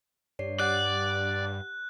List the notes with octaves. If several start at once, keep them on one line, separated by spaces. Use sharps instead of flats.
G2 C#5 D5 C7
G4 D5 F#5 F#6 G6